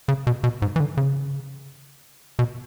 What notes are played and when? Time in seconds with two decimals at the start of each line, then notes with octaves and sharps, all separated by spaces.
0.08 C#3
0.27 B2
0.44 B2
0.62 G#2
0.76 E3
0.80 D3
0.97 C#3
2.39 B2